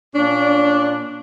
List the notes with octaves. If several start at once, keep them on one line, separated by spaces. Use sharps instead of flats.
A#2 C#4 D4